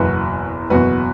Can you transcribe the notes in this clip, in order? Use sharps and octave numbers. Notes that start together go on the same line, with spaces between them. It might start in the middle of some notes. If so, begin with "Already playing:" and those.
Already playing: F#1 E2 B2 F#4 B4
F#1 E2 B2 F#4 B4